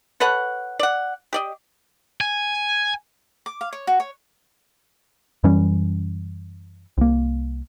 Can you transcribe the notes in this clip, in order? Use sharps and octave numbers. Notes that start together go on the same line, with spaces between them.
A4 B4 C#5 F#5
D5 F#5
G4 D5 D#5
G#5
D6
F5
C#5
F#4
C#5
F#2 E3 G3 C#4
C2 A#3